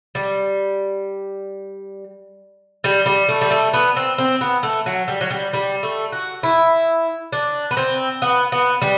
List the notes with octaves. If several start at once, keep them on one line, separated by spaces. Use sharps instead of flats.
G3
G3
G3
A3
G3
A3
B3
C4
C4
B3
A3
F#3
G3
F#3
G3
G3
A3
F#4
E4
D4
B3
C4
B3
B3
G3